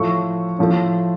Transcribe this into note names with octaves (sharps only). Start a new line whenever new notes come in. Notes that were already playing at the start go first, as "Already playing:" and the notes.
Already playing: A2 F3 A3 C#6
A2 F3 A3